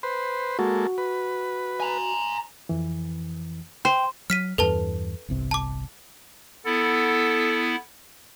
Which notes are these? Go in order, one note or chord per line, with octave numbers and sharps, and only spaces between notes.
B4 C5
G#3 A#3 F#4 A4
B4
G#5 A#5
F2 E3
C5 G5
F#3 F6 B6 D#7
E2 G2 E3 A4 B4 A5
G1 C2 C3
A5 D6
B3 E4 A4